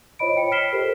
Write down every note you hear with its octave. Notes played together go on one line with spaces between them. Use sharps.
F4 C5 C#5 D#5 B5 D7
G5 C#7
F6 B6 C7 E7 G7
G4 A4 A#4 C5